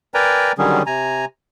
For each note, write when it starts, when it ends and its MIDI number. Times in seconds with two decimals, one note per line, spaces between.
0.14 0.52 70
0.14 0.52 71
0.14 0.52 74
0.14 0.52 79
0.14 0.52 80
0.14 0.52 82
0.58 0.83 50
0.58 0.83 51
0.58 0.83 54
0.58 0.83 55
0.58 0.83 61
0.58 0.83 68
0.86 1.25 48
0.86 1.25 80
0.86 1.25 82